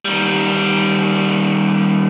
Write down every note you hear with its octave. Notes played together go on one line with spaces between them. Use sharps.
D#3 G3